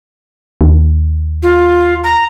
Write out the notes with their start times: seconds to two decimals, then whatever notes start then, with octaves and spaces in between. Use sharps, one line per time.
0.61 D#2
1.43 F4
2.04 A#5